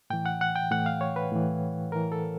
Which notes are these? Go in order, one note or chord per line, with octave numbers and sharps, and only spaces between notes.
A2 E3 G5
F#5
F#5
G5
A2 E3 F#5
F5
C#5
B4
A2 E3
A2 E3 A#4
A4